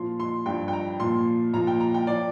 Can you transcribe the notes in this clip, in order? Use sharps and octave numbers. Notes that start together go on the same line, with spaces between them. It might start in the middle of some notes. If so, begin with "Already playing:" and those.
Already playing: A#2 F3 C6
C6
G2 F3 G5
G5
A#5
A#2 F3 C6
A#2 F3 A#5
G5
A#5
G5
F3 D5